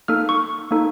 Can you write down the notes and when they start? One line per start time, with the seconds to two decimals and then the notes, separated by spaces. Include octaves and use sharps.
0.08 A#3 D#4 A4 F6
0.29 C#6
0.71 A#3 D#4 A4